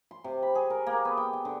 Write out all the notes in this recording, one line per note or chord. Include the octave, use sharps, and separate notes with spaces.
C6
C3
B5
G#4
A#4
A#3
B3
G5
G5
D3